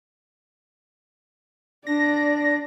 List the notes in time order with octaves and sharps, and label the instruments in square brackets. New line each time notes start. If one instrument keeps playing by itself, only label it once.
[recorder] D4 [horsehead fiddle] D5 [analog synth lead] A#6